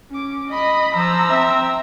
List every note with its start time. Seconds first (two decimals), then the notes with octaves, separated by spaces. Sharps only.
0.11 C#4 D6
0.49 D#5 B5
0.96 F3 A#5 E6
1.30 C4 E5